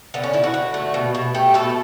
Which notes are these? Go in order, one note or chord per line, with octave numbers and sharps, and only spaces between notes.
D3 B3
C#4
D3 E4
F#4
D3
A3
B2
B2
A3 G4
B2 A4